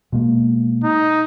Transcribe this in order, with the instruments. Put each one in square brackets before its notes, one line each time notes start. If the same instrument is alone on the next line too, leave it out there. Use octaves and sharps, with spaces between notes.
[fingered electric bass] B2 G#3 A#3
[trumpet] D#4